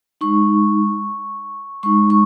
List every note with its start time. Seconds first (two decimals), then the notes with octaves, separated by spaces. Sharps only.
0.21 G#3 D#4 C#6
1.83 G#3 D#4 C#6
2.10 C#6